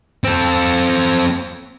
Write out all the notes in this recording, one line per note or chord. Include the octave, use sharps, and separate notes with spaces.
C4 A4